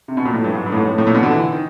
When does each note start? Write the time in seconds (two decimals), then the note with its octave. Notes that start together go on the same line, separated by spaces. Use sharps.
0.08 C3
0.17 B2
0.25 A#2
0.33 A2
0.44 G2
0.55 G#2
0.66 G2
0.72 A2
0.77 G#2
0.88 A2
0.98 A2
1.07 A#2
1.15 B2
1.23 D3
1.31 E3
1.52 D#3